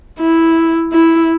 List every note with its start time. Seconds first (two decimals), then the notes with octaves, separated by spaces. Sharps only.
0.20 E4
0.93 E4